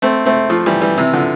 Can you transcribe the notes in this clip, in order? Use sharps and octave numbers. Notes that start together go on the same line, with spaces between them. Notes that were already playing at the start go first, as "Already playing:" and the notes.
A3 C4
A3 C4
F3 A3
E3 G3
E3 G3
C3 E3
D3 F3